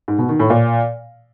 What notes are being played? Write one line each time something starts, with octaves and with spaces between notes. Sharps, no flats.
G#2
B2
D#3
A2
A#2